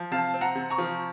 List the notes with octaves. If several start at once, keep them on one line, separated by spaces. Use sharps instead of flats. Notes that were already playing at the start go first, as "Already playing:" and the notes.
Already playing: F3
C3 F5 A5
C4
F#5 A#5
C3
A#5 C#6
F3